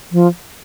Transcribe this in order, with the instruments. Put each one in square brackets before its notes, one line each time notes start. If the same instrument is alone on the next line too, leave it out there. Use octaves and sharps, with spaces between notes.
[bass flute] F3